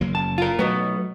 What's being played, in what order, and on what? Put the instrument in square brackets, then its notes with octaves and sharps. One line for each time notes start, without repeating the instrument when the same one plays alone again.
[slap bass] F#1 F#3 A#3
[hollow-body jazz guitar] A5
F4 A#4
[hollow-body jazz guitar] B1 B2 B3 [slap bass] F#3 A3